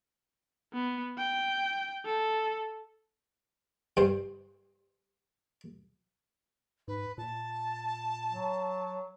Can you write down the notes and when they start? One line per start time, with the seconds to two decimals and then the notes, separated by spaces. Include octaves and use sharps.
0.73 B3
1.18 G5
2.05 A4
3.97 G2 C5
6.88 G#2 B4
7.18 A#2 A5
8.31 F#3